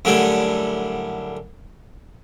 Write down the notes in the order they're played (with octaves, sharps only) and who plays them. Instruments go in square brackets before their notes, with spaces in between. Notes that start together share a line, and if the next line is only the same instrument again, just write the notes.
[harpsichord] F#2 A2 D3 G3 G#5